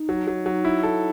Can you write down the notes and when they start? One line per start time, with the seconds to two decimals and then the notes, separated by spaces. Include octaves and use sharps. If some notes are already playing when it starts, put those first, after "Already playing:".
Already playing: D#4
0.09 F#3
0.27 F#3
0.46 F#3
0.65 E4
0.83 A4